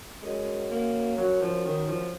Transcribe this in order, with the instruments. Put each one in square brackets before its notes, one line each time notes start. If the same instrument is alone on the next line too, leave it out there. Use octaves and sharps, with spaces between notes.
[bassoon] F#2 [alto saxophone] G#3
[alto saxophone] A#3
F#3
F3
D#3
F3